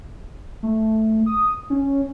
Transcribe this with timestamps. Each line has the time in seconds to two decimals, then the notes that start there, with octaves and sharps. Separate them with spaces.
0.63 A3
1.26 D#6
1.70 C#4